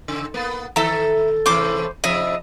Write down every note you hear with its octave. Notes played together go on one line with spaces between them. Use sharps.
C#3
A#3 B3
D#3 A4 E5 A#5
A2 C3 E3 C5 D6
C3 F3 D#5 E5